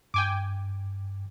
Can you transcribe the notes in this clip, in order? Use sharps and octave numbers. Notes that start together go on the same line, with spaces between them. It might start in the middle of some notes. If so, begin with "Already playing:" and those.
G2 G5 G#5 D6